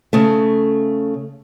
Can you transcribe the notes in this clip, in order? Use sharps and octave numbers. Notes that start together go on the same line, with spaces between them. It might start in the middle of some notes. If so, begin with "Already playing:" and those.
C#3 A3